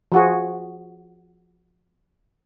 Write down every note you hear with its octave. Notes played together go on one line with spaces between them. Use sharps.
F3 F#4 G#4